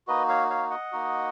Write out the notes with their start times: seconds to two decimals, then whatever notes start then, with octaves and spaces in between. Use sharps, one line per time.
0.07 A#3 D#4 F#4 B4 D#5
0.29 C#5 F5
0.50 C#5 F5
0.70 D#5 F#5
0.92 A#3 D#4 F#4